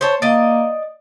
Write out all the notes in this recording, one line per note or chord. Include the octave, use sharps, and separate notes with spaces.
C5 C#5 A5
A#3 D5 D#5